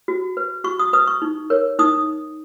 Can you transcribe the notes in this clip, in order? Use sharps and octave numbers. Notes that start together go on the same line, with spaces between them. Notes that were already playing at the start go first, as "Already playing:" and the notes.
F#4
B4
F#4 C#6
D#6
B4 D#6
C#6
D#4
A#4 C#5
D#4 D#6